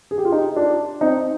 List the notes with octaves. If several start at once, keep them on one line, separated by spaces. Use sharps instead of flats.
G#4
G4
F4
D#4 G4
D4 F4
C4 D#4